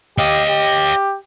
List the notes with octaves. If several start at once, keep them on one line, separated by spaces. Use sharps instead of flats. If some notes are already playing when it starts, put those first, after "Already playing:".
G4 D#5 F5
G4